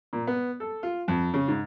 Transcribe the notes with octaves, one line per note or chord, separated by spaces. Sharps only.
A#2
B3
A4
F4
F2
C#3
G#2